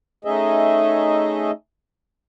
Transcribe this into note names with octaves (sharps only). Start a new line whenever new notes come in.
A3 C#4 D#4 G#4 D#5 E5